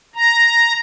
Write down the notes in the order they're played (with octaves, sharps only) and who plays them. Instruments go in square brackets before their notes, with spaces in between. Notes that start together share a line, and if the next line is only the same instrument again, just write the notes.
[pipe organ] A#5